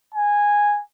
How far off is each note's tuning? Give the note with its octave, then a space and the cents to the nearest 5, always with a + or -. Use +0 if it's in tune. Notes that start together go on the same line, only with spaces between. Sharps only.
G#5 -10